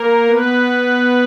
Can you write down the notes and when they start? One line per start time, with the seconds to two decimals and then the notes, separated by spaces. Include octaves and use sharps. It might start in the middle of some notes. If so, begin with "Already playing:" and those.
Already playing: A#3 A#4
0.27 B3 B4